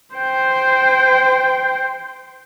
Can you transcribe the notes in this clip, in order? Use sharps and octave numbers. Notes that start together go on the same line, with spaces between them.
C5 G5